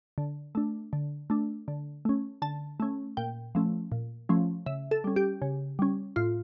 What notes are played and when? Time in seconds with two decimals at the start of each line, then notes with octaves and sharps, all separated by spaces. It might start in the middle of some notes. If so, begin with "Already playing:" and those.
0.18 D3
0.55 A3 D4
0.93 D3
1.30 A3 D4
1.68 D3
2.05 A3 C#4
2.42 D3 A5
2.80 A3 C#4
3.17 A#2 G5
3.55 F3 A3 C#4
3.92 A#2
4.29 F3 A3 C#4
4.66 C#3 E5
4.91 A4
5.04 G3 C#4
5.16 G4
5.42 C#3
5.79 G3 C#4
6.16 A2 F4